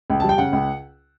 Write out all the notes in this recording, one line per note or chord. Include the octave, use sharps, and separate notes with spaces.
C#2
G3 A5
G5
C#3 F#5
C#2